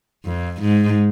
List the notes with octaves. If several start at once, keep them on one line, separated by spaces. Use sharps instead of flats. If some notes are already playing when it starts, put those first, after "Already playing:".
F2
G#2